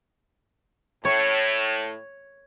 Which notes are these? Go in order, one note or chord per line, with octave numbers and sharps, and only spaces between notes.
A2 C#5